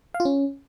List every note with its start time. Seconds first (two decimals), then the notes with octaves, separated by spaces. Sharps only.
0.14 F5
0.20 F4
0.25 C#4